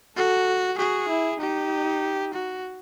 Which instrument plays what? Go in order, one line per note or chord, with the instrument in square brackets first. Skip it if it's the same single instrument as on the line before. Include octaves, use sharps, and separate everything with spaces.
[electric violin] F#4 [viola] A4
[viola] F#4 [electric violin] G#4
[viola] E4
[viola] D#4 [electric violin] G4
[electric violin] F#4